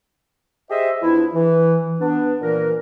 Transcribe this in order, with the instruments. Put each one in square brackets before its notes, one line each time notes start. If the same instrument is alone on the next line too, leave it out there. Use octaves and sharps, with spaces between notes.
[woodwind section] G4 G#4 C5 D#5 E5
E2 F3 D4 E4
E3
B3 D4
A#2 E3 A#4